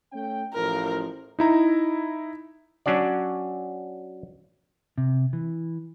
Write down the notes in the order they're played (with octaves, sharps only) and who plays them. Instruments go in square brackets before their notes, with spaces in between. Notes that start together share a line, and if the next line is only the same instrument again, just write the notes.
[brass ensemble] A3 C#4 G5
[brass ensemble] A1 F3 [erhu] A#4
[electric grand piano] D#4 E4 A#5
[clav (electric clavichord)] F#3 C#4 D4 F#4 D5
[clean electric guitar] C3
E3